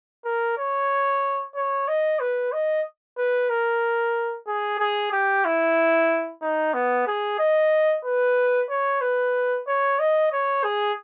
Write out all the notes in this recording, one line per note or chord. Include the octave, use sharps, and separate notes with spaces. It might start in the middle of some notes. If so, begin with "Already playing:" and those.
A#4
C#5
C#5
D#5
B4
D#5
B4
A#4
G#4
G#4
G4
E4
D#4
B3
G#4
D#5
B4
C#5
B4
C#5
D#5
C#5
G#4